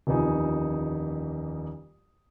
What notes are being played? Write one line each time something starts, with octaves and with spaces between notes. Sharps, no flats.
D#1 F2 E3 D#4 G#5